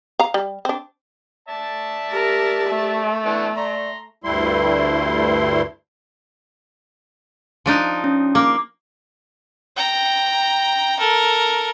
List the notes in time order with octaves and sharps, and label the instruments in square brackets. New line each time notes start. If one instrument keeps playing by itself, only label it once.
[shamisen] F5 A#5
G3
C4 D4
[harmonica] D5 E5 A5
[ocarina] G4 [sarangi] A#4
[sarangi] A3
[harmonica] E3 B3 D4
[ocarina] D5 [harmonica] A#5 C6
[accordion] D2 G2 G3 A3 E4 C6
[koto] F3 D4 D#4
[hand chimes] C#4
[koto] A#3 [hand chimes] D6
[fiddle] G5 A#5
A4 A#4